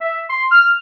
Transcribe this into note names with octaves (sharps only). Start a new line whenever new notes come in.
E5
C6
F6